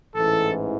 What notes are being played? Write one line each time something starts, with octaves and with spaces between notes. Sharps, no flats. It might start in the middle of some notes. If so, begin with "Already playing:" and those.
A1 G#2 E3 A4